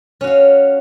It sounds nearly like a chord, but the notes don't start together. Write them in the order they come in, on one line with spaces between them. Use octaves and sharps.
C#4 F#4 F5